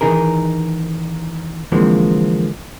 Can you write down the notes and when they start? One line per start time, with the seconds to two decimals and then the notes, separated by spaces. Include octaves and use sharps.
0.01 D#3 E3 D#4 G#4 A#4
1.72 D3 E3 F3 G#3 A#3 C4